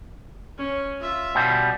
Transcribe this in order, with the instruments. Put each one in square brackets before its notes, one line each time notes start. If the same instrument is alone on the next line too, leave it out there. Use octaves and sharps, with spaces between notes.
[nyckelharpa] C#4
F4 E5
[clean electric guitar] B2 G3